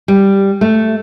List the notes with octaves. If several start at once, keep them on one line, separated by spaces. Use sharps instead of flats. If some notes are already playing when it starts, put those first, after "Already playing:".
G3
A3